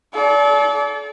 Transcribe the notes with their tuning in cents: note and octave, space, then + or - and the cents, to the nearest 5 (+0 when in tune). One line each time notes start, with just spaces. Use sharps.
A4 -40 D5 -30